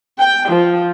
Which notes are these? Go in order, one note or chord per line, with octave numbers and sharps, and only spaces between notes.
G5
F3